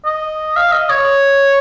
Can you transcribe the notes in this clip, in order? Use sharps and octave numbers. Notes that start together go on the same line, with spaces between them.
D#5
F5
D#5
C#5